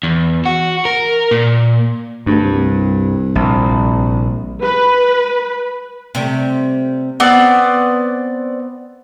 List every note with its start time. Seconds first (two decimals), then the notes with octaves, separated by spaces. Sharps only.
0.03 E2
0.46 F#4
0.85 A#4
1.31 A#2
2.26 D2 G2
2.43 C2
3.35 A#1
4.63 B4
6.15 C3 G3 A3
7.20 B3 C4 D5